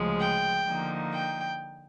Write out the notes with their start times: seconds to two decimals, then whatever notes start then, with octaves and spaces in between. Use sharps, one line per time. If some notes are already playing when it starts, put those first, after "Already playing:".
Already playing: D2 C#3 F3 G#3
0.21 G5
0.67 D3 F3 A#3 D#4
1.13 G5